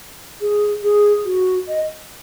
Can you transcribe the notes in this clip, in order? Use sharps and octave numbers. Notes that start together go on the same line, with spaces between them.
G#4
G#4
F#4
D#5